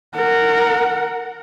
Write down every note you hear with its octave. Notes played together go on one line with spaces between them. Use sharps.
A#4 F#5